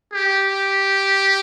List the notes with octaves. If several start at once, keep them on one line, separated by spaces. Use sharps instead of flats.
G4